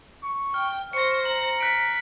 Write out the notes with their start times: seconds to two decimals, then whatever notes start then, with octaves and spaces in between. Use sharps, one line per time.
0.24 C#6
0.54 G5 F6
0.93 C5 C#6 A#6 C#7
1.25 A#5 F#7
1.61 F#6 B6 D7